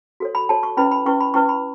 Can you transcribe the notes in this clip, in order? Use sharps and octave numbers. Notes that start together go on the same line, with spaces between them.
F#4 A4 C#5
B5
F#4 A4 C#5 A5
C#6
C#4 E4 B4 B5
B5
C#4 E4 B4 C#6
B5
C#4 E4 B4 C#6
B5